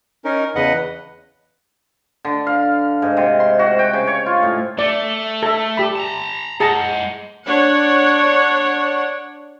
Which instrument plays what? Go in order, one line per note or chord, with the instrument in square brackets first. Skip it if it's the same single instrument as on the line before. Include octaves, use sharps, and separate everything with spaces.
[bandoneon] C#4 D#4 A#4
E2 C#3 B4 D#5 F#5
[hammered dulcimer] D3
F5
G#2
C3
C6
F#4
G5
C#3
C#5
F4
A2
[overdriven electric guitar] A3 [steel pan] D5
[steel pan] A4 E5
G4 B5
[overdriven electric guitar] A5 A#5
[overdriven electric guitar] G#3 F#5 [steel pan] G#4 A5 A#5
[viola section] D4 C#5 F#5